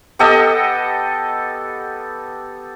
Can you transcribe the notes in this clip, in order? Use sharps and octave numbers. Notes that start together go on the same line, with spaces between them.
B3 G4 A4 D#5